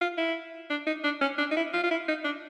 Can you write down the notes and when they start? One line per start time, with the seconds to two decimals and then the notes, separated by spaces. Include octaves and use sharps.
0.01 F4
0.17 E4
0.70 D4
0.86 D#4
1.04 D4
1.21 C#4
1.38 D4
1.51 D#4
1.56 E4
1.73 F4
1.83 F4
1.91 E4
2.08 D#4
2.24 D4